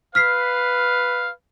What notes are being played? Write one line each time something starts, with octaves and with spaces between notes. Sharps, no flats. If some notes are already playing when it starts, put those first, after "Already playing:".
B4 F5 F6 B6 C7